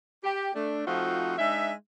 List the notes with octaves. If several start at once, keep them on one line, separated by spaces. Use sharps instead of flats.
G4
A3 D4
F3 A3 C4 D#4 F4 F#4
G#3 D4 D#4 E5